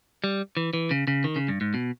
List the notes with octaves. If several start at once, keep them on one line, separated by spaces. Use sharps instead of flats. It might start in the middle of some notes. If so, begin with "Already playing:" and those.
G3
E3
E3
C#3
C#3
D#3
C#3
G2
G#2
B2